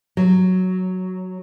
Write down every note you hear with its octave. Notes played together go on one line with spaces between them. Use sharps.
F#3